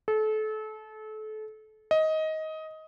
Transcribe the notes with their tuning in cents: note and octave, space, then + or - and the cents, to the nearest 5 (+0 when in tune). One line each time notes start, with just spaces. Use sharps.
A4 -30
D#5 +15